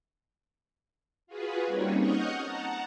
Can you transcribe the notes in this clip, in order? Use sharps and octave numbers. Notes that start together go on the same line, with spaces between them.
F4 F#4 G#4 B4
G3 A#3 C4 C#4 D#4 C#5
D#5 F#5 C#6 D#6 F6 G6
F#5 A5 A#5